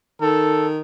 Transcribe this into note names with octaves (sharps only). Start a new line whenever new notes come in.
D#3 A4